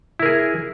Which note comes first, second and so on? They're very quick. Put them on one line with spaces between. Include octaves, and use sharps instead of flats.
E4 A#4 G#4